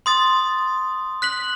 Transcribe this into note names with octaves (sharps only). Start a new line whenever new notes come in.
C6 D#6 A6
F#6 B6 F#7